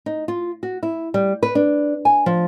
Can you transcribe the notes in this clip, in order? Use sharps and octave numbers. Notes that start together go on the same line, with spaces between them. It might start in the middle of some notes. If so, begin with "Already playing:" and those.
D#4
F4
F#4
E4
G3
B4
D4
G#5
F3